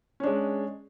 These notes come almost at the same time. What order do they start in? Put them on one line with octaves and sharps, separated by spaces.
C#4 D4 G#3